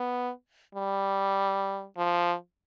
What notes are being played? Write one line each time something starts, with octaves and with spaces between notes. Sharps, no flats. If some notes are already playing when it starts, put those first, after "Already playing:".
Already playing: B3
G3
F3